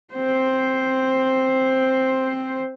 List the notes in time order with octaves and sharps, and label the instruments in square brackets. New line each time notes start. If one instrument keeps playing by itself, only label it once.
[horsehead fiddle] C4 C5